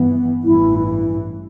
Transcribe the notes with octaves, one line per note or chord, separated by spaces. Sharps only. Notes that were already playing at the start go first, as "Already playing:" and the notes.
Already playing: G2 E3 B3
A1 G2 E3 E4